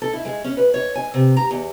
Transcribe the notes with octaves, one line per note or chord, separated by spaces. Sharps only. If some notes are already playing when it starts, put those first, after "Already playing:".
A4
E4
G#3
C#4
B4
C#5
G#5
C3
A#5
E2